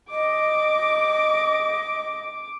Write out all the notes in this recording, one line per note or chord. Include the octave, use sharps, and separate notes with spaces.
D#5 D6